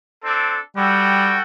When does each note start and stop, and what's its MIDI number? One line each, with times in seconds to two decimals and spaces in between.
0.24 0.57 60
0.24 0.57 62
0.24 0.57 69
0.77 1.37 55
0.77 1.42 66
0.77 1.42 69
0.77 1.42 79